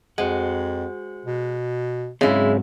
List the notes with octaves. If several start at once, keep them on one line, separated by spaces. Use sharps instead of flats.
F2 G#3 F#4 C5 F#5
B2
G#2 C#3 F#3 G#3 C4 E4